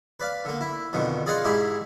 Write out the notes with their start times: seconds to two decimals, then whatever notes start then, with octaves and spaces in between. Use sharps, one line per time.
0.20 B4 D5 F5
0.45 D3 A#3
0.61 E4
0.93 F2 B2 D3 D#3
1.26 G#4 D5 D#5 F5 F#5 C6
1.45 G#2 E4 G4 G#4